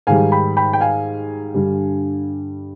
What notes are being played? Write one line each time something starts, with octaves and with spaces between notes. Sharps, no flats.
G#2 D#3 G3 F5 G#5
G5 B5
G5 B5
G5
F5 G#5
G2 D3 G3